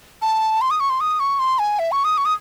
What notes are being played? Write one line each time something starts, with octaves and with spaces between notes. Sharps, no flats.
A5
C6
D#6
C#6
C6
D#6
C#6
C6
G#5
E5
C#6
D#6
C#6
D#6